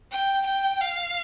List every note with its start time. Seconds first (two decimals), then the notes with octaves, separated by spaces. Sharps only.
0.12 G5
0.47 G5
0.82 F5